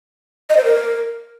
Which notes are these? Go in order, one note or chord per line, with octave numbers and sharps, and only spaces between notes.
D#5
C5
A#4